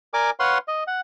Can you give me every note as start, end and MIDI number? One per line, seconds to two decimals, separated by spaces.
0.14 0.30 70
0.14 0.30 74
0.14 0.30 80
0.14 0.30 86
0.40 0.58 71
0.40 0.58 73
0.40 0.58 77
0.40 0.58 78
0.40 0.58 84
0.68 0.84 75
0.87 1.01 78